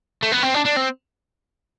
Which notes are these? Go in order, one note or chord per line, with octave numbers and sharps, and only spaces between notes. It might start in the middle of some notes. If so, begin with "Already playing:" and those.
A3
B3
C4
D4
D4
C4